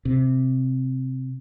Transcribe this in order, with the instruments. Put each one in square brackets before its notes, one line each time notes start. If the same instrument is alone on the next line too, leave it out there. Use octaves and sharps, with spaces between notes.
[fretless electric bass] C3